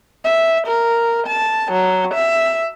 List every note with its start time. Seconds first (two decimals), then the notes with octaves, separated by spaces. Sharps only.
0.24 E5
0.67 A#4
1.27 A5
1.72 F#3
2.14 E5